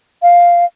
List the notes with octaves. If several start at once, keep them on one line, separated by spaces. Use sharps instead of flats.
F5